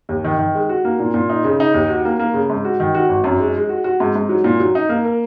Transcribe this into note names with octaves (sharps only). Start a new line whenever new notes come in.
D#2
D#3
D#3
G#3
F#4
A#3
A#2
A#2
D#4
C#3
D#4
D#2
F#4
A#3
A#3
C#3
G#2
F#4
D#3
F#4
G#1
F#2
G#3
G#3
F#4
F#4
G#2
G#2
F#3
A#2
F#3
D#4
A#3
A#4